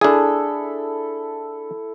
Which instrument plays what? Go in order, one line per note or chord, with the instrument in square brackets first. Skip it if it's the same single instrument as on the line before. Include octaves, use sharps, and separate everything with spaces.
[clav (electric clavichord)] D4 G#4 [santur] E4 A4